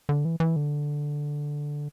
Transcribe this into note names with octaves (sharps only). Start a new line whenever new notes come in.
D3
E3
E3
D3